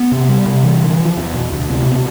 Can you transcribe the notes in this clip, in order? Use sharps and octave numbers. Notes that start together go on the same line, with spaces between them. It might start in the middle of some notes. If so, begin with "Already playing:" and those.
Already playing: B3
C3
G3
C3
E3
D3
F3
E2
B2
D2
C3
B2